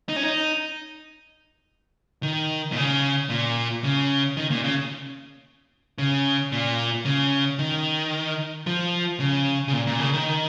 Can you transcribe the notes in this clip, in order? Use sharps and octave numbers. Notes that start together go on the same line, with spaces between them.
D#4
C#4
D#4
D#3
A#2
C#3
A#2
C#3
D#3
A#2
C#3
C#3
A#2
C#3
D#3
F3
C#3
C#3
A#2
A#2
C#3
D#3